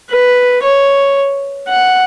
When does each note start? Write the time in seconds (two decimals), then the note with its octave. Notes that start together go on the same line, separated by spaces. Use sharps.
0.11 B4
0.63 C#5
1.69 F#5